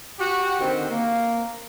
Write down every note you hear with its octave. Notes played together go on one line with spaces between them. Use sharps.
F#4 G4
D3 D#3 C4
A#3